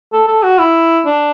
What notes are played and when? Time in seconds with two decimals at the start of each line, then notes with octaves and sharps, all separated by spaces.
0.13 A4
0.28 A4
0.43 F#4
0.59 E4
1.06 D4